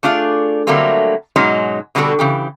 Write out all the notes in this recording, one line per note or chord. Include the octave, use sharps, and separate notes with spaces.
A3 D4 F4 G#4 D5
D3 F#3 G3 A3 A#3 C4
G#2 B2 F#3 G#3 C#4 D#4
B2 D3 G3 C4 F#4 A4
C#3 E3 G4